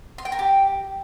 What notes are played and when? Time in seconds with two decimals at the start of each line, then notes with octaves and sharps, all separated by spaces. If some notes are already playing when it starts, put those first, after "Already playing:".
0.18 C6
0.25 G5
0.32 A#4
0.39 G4